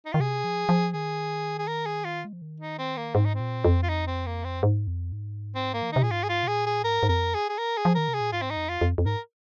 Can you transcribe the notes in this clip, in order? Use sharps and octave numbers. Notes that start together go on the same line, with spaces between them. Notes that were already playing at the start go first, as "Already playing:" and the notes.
D#4
D#3 F4
C3 G#4
F3
F3
D#3 G#4
G#4
A#4
G#4
F4
G#3
F3
D#3
D#4
C4
A#3
G#2 C4
D#4
C4
A#2
F2
F4
D#4
C4
A#3
C4
G#2
F2
G#2
C4
A#3
F3
D#3
C3 D#4
A#2 G#4
G#2 F4
G#4
F4
C3
A#2 G#4
G#4
G#2 A#4
G#2
F2 A#4
G#4
G#4
A#4
G#4
F3
D#3 A#4
C3
G#4
A#2
G#2 F4
C4
D#4
F2
F4
F2
F2
G#2 A#4